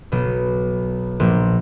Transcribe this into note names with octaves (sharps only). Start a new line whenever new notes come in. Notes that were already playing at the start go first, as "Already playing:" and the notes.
B1 B2
A#1 A#2